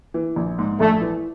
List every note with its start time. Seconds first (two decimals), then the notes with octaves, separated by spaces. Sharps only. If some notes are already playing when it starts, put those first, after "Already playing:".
0.14 E3
0.36 A#1
0.59 G#2
0.80 A#1 A3
1.01 E3